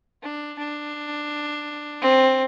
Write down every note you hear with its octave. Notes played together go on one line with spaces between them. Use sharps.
D4
D4
C4